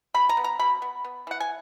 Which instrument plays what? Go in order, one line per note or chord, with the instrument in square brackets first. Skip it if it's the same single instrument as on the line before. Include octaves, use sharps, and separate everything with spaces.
[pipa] B2 B5
A#5
B3
A#5
B2 B5
B3
B3
E3 F#5
G#5